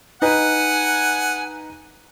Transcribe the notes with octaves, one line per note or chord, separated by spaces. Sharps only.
D#4 B4 F#5 G#5